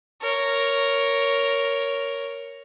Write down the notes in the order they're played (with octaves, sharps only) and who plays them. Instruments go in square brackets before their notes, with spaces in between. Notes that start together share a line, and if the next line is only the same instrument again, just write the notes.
[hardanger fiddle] A#4 C#5